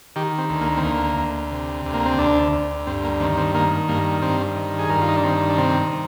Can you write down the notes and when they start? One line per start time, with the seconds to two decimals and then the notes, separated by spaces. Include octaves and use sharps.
0.16 D#3 G4
0.38 C4
0.49 D2
0.61 A#3
0.77 C4
0.83 D2 A#3
1.17 D2
1.52 C3
1.86 D2
1.94 A#3
2.06 C4
2.18 D2 D4
2.52 D2
2.87 G2 C4
3.04 A#3
3.20 D#3 C4
3.37 C4
3.54 D#3 A#3
3.88 G2 A#3
4.22 G2 C4
4.56 D#3
4.79 G#4
4.90 G2 A#4
5.01 F4
5.09 D#4
5.16 D4
5.24 D#3 C4
5.50 D4
5.58 C3 C4
5.92 C3